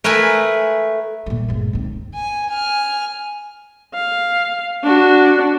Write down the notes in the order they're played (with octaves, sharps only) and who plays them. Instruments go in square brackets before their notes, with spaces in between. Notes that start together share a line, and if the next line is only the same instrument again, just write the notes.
[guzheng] A3 A#4 B4 E5 G#5
[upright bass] A#2 G3
G1 C#2
D#3 C4
[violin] G#5
G#5 F6
[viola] F5
D4 F#4